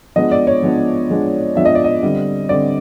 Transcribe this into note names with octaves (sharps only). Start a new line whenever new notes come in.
F3 G#3 B3 D4 D#5
D5
C#5
F3 G#3 B3 D4
F3 G#3 B3 D4
F3 G#3 B3 D4 E5
D#5
D5
D#5
D3 G3 C4
D3 G3 C4 D5